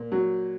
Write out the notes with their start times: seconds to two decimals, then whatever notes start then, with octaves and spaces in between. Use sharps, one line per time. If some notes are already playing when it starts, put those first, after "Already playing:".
Already playing: A#2
0.12 F#3